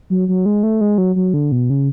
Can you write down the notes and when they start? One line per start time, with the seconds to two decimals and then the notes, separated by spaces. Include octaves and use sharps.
0.10 F#3
0.28 F#3
0.46 G#3
0.63 A3
0.81 G#3
0.98 F#3
1.16 F#3
1.34 D3
1.52 B2
1.70 C#3